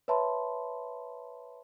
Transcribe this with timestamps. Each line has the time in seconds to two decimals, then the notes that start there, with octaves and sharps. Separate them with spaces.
0.08 B4 C#5 E5 A5 B5 C6